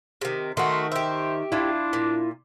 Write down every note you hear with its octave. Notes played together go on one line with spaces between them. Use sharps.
C3 D#3
D#3 A3 F#4 C6
G4 C5 E5
D4 E4 F4
A#2